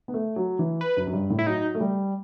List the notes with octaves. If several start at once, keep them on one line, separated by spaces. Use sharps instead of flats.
B3
A3
F#3
E3
B4
F#2
F#2
G2
A2
E4
F#3 D#4
A3
G3